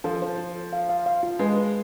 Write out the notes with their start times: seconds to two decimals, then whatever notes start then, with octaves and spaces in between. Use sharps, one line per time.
0.04 F3 A4
0.22 C5
0.38 F4
0.55 A4
0.73 F5
0.89 F5
1.06 F5
1.23 F4
1.39 G#3 B4
1.57 B4